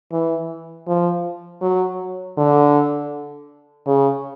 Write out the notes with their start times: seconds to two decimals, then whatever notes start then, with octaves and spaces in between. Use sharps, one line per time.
0.12 E3
0.87 F3
1.62 F#3
2.37 D3
3.87 C#3